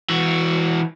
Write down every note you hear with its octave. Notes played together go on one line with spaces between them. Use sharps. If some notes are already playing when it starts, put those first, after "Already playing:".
E3 F#4